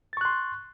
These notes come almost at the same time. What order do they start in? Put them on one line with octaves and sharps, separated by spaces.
A6 C#6 F#6 C6